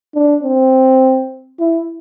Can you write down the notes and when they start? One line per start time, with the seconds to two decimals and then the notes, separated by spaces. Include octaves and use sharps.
0.15 D4
0.43 C4
1.59 E4